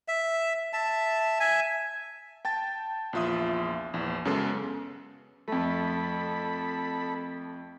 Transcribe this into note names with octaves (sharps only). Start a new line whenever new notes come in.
E5
E5 A5
E5 G#5
G5 A5 A6
A#1 E2 F4 E5 D#6
A#1 E2
F#2 C#3 G#3 B3 A4 E6
F2 A3 A4 B5